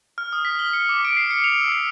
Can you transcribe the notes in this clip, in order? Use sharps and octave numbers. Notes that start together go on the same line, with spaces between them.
F6
D#6
B6
G7
C#7
D6
D7
C7
C#7
F7
E6
C7